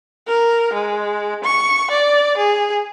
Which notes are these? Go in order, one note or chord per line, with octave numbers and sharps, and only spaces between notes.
A#4
G#3
C#6
D5
G#4